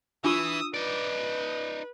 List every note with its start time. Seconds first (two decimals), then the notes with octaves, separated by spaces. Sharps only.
0.24 E3 D4 F4 C#6 D#6 E6
0.74 D#4 B4 D5